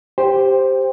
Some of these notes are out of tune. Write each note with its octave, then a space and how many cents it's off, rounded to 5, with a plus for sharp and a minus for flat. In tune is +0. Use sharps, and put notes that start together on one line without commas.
G4 +0 C5 +0 G5 +15